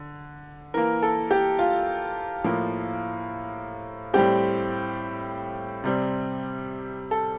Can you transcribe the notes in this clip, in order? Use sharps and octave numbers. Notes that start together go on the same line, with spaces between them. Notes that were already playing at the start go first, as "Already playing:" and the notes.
Already playing: D3
E3 A#3 A#4
A4
G4
F4
A2 F3 A#3
A2 G3 C4 G4
C3 G3 C4
A4